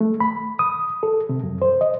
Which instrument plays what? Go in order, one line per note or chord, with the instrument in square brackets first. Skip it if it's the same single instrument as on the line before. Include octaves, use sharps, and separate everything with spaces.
[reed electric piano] A3
B5
D#6
A4
C3
F#2
C5
D#5